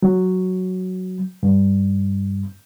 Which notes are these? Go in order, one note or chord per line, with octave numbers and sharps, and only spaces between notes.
F#3
G2